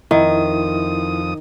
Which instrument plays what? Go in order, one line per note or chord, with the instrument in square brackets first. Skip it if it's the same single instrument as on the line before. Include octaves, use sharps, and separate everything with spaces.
[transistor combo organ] F2 D#6 [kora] D#3 [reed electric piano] E4 [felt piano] D#5